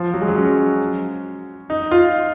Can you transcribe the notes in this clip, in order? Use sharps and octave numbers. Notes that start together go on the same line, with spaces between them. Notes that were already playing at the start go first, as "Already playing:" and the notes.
Already playing: F3
F#3
G#3
F#3
C#4
D#4
F4